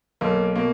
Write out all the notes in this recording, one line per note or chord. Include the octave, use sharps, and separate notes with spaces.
B1 A#3
B2 A#3